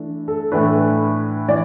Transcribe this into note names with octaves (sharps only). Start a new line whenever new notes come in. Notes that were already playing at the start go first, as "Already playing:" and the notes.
Already playing: E3 A3 D4
A4
A2 E3 A3 D4 B4
E3 D5